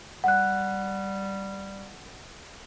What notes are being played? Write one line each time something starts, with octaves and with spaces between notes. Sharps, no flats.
G3 F#5 F#6